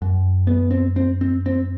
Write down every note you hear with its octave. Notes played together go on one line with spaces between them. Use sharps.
F#2
B3
C4
C4
C4
C4